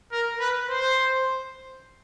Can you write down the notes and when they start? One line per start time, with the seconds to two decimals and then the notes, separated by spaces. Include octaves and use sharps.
0.12 A#4
0.40 B4
0.70 C5